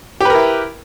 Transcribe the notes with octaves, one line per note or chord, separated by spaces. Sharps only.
E4 G4 A#4 B4